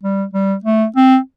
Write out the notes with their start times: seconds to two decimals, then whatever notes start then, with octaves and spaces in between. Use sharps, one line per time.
0.04 G3
0.34 G3
0.64 A3
0.96 C4